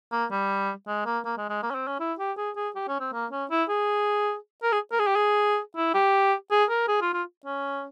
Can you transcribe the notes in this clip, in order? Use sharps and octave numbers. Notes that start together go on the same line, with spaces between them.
A#3
G3
G#3
A#3
A#3
G#3
G#3
A#3
C#4
C4
C#4
E4
G4
G#4
G#4
G4
C#4
C4
A#3
C#4
E4
G#4
A#4
G#4
A#4
G#4
G4
G#4
E4
G4
G#4
A#4
G#4
F4
F4
C#4